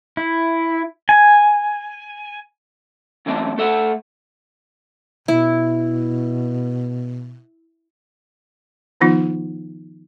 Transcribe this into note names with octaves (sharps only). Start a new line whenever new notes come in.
E4
G#5
F#2 E3 A3 C4 E5 A5
A3 A4 E5 F#5
B2 E4
D#3 F3 B3 D#4 F4